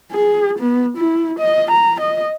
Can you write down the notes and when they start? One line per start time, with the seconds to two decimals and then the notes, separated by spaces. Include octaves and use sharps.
0.12 G#4
0.59 B3
0.97 E4
1.39 D#5
1.71 A#5
2.00 D#5